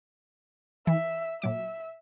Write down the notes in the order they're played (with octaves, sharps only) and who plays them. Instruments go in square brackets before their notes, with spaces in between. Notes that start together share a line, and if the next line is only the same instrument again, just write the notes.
[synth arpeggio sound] E3 [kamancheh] E5
[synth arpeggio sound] A#2 F#3 D6 [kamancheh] E5